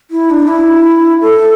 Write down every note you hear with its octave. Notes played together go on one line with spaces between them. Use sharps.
E4
D4
E4
A4